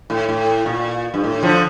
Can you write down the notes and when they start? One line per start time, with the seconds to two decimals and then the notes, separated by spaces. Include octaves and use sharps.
0.10 A2
0.29 A2
0.66 A#2
1.14 G2
1.24 A2
1.43 D3 F3